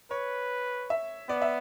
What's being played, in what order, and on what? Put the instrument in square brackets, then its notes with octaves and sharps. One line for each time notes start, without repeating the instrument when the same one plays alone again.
[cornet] B4 [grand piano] C#5
[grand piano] E5
[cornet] B3 [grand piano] D5
[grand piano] E5